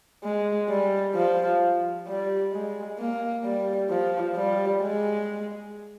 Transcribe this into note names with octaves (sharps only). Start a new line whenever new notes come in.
G#3
G3
F3
G3
G#3
A#3
G3
F3
G3
G#3